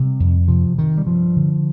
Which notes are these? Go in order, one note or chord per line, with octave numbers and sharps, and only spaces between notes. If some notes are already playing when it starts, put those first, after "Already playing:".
Already playing: C3 G3
F2
C3 F3
C3 D#3
G3
G2 F3
D3